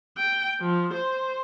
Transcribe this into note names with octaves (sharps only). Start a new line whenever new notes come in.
G5
F3
C5